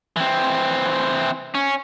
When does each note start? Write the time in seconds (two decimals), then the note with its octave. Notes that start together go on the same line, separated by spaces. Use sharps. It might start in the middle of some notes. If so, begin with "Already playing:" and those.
0.16 E3 C4
1.55 C#4